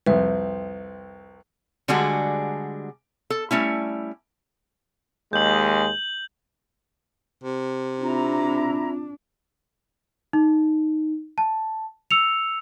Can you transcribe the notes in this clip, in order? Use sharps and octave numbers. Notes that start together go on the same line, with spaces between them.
C2 F2 B4 E5
D3 G3 G#3 D4 F#4 G#4
A4
G3 A3 C#4 E4
D#2 G#3 G6 F#7
C3
C4 D4 E4 F4 A#5
D#4
A5
E6 C#7 F7